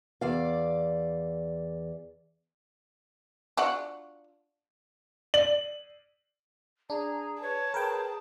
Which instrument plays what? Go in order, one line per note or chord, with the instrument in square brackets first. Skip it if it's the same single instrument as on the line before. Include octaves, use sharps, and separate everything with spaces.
[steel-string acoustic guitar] E2 D5 F5
[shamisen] D4 F4 F#4
[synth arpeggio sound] D5 [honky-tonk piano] F#7
[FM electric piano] D4 [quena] G#4 [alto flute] A#5
[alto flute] B4 [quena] C#5 [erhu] A5
[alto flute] G#4 [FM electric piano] A#4 B4 G5